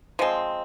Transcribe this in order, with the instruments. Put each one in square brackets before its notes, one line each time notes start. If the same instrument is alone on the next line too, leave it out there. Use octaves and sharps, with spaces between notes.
[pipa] F3 G#3 C4 [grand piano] D#5